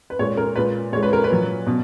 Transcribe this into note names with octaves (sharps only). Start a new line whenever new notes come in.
B4
A#2 G#3 C#5
A#4
A#2 G#3 B4
A#2 G#3 C#5
B4
A#4
B4
A#2 F#3
B2